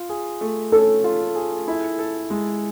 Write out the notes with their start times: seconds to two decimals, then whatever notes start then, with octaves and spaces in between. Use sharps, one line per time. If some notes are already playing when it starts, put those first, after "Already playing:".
Already playing: F4
0.09 G#4
0.41 A3
0.72 C#4 A4
1.04 F4
1.35 G#4
1.68 E4
1.99 A4
2.30 G#3